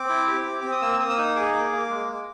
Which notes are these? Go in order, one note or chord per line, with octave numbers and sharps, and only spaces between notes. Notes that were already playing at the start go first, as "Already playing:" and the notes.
Already playing: C4 D6
E4
G4
C4
C4 D6
D#6
A#3 E6
A#3 D#6
E6
D#4 D#6
G#4 D6
A#3
A#3
G#3
G#3